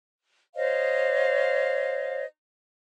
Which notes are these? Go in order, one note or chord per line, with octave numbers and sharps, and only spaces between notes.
C5 C#5 D#5 F5